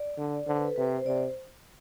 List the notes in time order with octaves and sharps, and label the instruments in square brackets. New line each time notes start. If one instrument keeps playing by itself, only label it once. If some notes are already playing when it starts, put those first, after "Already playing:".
Already playing: [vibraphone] D5
[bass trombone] D3
[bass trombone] D3 [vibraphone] C5
[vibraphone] B4
A4
[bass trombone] C3 [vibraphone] B4
[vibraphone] C5
C5
[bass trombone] C3 [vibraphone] D5
[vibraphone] C5